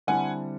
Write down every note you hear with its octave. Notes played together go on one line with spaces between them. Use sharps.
D3 G3 C4 E4 F#5 G#5